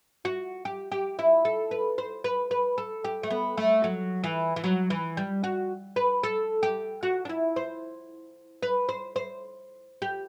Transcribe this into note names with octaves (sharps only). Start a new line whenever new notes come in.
F#4
G4
G4
E4
A4
B4
C5
B4
B4
A4
G4
A3
B3
A3
F#3
E3
E3
F#3
E3
G3
F#4
B4
A4
G4
F#4
D4
E4
C5
B4
C5
C5
G4